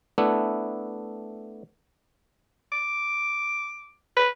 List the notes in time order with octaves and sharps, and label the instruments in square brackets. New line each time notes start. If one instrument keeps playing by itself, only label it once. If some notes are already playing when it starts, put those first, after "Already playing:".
[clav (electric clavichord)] A3 B3 D4 E4
[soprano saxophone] D6
B4